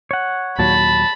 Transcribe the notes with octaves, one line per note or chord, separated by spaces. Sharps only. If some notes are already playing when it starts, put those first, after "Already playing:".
C#5 F#5
D#2 A#2 F#3 A5 B5